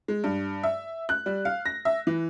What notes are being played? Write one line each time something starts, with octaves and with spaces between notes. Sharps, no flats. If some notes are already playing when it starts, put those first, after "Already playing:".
G#3
G2
E5
F#6
G3
F5
A#6
E5
E3